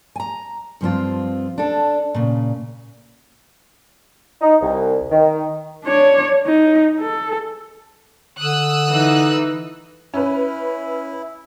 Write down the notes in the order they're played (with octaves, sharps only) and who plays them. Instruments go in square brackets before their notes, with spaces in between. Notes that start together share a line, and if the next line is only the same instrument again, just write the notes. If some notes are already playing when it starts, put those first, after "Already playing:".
[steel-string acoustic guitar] G#5 A#5
G2 F3 C4 F4
D4 A4
A#2 C#3
[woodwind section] D#4
C2
D#3
[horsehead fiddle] D4 C#5
D#4
A4
[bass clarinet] D3 [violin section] D#6 E6 F#6
[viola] E3 D#4
[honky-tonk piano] C#4 B4 [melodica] E4